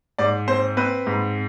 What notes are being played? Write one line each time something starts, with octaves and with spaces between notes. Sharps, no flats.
G#2 D5
C4 C5
C4 B4
G#2